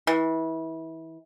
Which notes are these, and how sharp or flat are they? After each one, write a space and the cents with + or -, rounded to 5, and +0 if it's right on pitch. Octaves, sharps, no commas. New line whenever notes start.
E3 -25